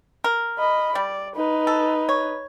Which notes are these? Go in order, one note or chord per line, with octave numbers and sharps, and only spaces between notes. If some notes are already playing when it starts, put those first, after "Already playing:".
A#4
D#5 B5
G3 D5
D#4 B4
A4
C#5